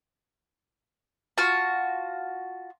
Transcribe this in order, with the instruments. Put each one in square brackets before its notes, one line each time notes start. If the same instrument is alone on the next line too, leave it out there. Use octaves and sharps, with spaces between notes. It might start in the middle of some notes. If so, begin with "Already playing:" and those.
[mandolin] F4 F#4 A5